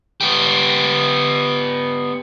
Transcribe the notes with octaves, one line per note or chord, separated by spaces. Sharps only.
B3 G4